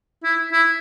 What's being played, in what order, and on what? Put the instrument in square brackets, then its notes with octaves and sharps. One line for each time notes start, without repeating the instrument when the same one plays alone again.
[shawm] E4
E4